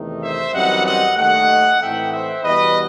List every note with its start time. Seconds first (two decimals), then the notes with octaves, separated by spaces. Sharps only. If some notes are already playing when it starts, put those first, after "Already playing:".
Already playing: E2 C3 D#3 A3 D#4
0.22 C5 E5
0.54 F#2 E3 G3 C4 D#4 D#5 F#5
0.86 D#5 F#5
1.18 D#2 D#3 A3 D#5 F#5
1.80 A2 E3 A3 C4 D#4 E5 G5
2.12 C5 E5
2.44 E2 B2 G3 B3 B4 D#5